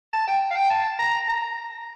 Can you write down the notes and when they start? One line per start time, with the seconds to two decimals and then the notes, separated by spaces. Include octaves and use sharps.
0.13 A5
0.28 G5
0.51 F5
0.56 G5
0.70 A5
0.99 A#5
1.28 A#5